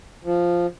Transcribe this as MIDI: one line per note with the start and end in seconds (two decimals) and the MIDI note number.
0.24 0.66 53